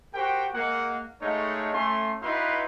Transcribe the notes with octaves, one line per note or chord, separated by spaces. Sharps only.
F#4 G4 A#4 C5 G5
G#3 A#3 F#5
G#3 A3 D#4 A4 C#5 F5
A3 C#4 C6
D#4 E4 F#4 B4 F5 C6